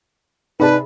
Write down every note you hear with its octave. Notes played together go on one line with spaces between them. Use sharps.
C3 D#4 G#4 B4 D5 A5 B5